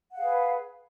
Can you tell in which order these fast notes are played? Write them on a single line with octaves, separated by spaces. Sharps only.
F#5 F5 G#4 B4